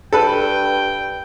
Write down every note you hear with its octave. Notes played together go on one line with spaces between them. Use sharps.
G2 A4 B4 G5